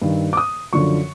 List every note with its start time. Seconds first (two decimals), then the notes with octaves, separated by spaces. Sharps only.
0.02 G2 D#3
0.33 D6
0.37 D#6
0.73 F#2 D3 F3 C#6